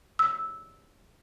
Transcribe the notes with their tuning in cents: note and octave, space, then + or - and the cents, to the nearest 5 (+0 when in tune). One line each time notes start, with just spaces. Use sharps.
E6 -10